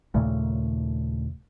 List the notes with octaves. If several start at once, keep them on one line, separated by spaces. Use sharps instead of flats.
D#2 A#2 C#3 A3